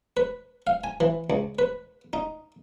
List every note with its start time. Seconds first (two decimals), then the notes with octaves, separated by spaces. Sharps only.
0.17 B4
0.67 F5
0.84 G#5
1.00 E3
1.30 C#2
1.59 B4
2.13 D#4